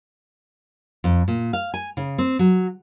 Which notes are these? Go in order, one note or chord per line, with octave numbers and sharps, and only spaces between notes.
F2
A#2
F5
G#5
C#3
C4
F#3